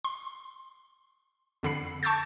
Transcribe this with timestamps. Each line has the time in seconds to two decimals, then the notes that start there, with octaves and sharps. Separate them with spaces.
0.04 C6
1.63 F2 D3 B5 C7
2.03 A5 C#6 D6 E6 G6 A6